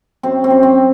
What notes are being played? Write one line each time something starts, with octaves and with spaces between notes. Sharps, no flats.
F#2 C4
C4
F#2
C4